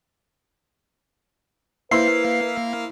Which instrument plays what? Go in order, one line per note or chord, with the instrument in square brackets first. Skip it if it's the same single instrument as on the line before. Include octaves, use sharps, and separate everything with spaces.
[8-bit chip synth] A#3 F5 [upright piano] E4 C5 [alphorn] B4 [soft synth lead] C7